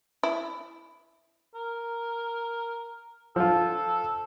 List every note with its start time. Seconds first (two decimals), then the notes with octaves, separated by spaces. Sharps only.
0.23 E4
1.55 A#4
3.36 F3 F4 A4